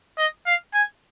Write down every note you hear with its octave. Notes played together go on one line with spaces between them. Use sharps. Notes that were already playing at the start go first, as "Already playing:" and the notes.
D#5
F5
G#5